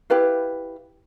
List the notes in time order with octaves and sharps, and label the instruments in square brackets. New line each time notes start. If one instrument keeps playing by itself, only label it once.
[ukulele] E4 G4 B4 F5